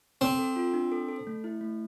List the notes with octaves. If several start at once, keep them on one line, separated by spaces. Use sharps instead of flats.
C4 A4
A4
F4
D4
A4
A4
A3
E4
A3